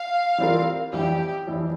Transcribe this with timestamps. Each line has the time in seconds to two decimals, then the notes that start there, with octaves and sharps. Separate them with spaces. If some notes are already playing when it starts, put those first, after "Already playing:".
Already playing: F5
0.38 E3 G3 C4 F4 A#4
0.92 F2 E3 G3 G4
1.47 F2 E3 G3